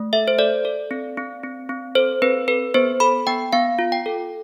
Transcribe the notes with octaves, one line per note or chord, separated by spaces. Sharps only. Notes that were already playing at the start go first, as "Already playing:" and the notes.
Already playing: A3
A4 E5
C5
A4 D5
A4
C4
C4
C4
C4
A4 C5
C4 B4
A4 B4
B3 C5
A4 B5
B3 G5
B3 F5
F4
G5
A4